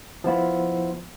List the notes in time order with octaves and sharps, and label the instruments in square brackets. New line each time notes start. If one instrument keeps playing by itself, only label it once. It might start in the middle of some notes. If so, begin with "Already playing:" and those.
[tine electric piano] F3 B3 E4 F4